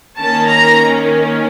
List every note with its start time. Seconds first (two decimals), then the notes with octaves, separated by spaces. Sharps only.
0.19 D#3 A#3 C#4 A5
0.49 A#5